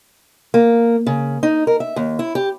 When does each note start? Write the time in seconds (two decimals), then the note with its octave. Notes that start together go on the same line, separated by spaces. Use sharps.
0.54 A#3
1.07 C#3
1.43 D#4
1.67 A#4
1.80 E5
1.96 D#2
2.19 E4
2.35 G4